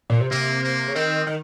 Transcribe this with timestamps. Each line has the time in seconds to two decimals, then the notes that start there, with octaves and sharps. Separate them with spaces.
0.10 A#2
0.21 C3
0.31 C3 A#3
0.63 A#3
0.88 C#3
0.95 D#3 C4
1.27 D#3